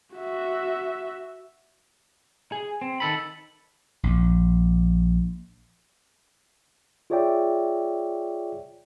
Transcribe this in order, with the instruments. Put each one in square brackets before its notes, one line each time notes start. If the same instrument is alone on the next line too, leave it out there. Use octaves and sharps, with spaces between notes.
[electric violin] F#4 E5
[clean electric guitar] G#4
C4
D#3 A4 B5
[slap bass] A#1
[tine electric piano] F4 G#4 C#5 D5 E5 G5